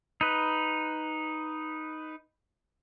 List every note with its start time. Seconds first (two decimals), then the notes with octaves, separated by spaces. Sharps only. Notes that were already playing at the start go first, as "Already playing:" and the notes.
0.21 D#4 B4